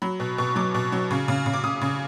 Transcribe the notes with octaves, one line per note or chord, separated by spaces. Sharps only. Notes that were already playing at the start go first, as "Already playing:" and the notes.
F#3 B5
B2
B2 C#6
F#3 D6
B2
F#3
C#3
C#3
C#3
D6
C#3 D#6
C#3